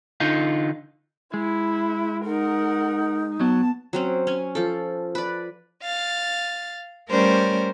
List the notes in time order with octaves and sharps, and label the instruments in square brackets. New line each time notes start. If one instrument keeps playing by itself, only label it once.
[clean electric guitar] D3 D#4 F4
[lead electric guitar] G#3 [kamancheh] E4
[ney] D#4 [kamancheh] A#4 F#5
[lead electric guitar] F#3 [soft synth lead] B3 [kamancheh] A5
[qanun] F#3 C4 C#4
C#4 G#5
F3 A4
B4 D5
[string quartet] F5 A6
G3 A3 C#4 A#4 C5 D5